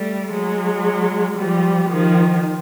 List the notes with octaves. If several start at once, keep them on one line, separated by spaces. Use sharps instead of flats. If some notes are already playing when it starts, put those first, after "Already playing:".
Already playing: G3 A3
F#3 G#3
F3 G3
D#3 F3